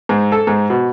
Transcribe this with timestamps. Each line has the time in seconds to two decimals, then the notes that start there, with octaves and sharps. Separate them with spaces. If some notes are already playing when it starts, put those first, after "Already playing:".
0.09 G#2
0.32 A4
0.47 G#2
0.70 B2